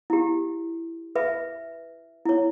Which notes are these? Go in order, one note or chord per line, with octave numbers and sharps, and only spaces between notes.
E4 G4
B4 E5
E4 C#5